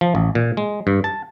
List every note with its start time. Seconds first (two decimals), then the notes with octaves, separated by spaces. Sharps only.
0.01 F3
0.15 A1
0.35 A#2
0.57 G#3
0.87 G2
1.04 A5